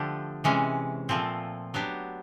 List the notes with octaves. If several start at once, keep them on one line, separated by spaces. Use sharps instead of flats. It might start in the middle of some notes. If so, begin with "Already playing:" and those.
Already playing: D3 F3 A3 D4 G4
C3 E3 G#3 C#4
A#2 F3 A3 C4
F#3 B3 D4 G4